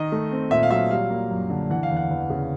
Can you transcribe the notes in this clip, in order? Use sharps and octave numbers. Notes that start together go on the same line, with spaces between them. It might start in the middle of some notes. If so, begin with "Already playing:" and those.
Already playing: D#3 D#5
A3
C4
A#2 E5
F5
F#3 E5
G3 F5
A#3
F#2
D3
E3 F#5
F5
E2
F#5
E2
C#3